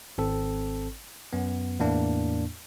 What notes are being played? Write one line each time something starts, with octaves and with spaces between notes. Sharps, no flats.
G#1 C4 A4
F#2 B3
E2 A2 A#3 D4